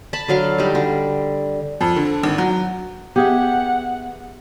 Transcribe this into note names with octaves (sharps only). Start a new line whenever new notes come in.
A5 B5
D3 F#3 F5
G3 D#4
D3
F2
D3
G#1
F#3
B3 G4 G#4 E5 F#5